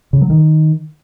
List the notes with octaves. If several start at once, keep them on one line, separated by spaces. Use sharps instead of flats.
C#3
F#3
D#3